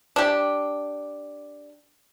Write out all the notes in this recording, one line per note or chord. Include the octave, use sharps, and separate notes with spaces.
D4 G4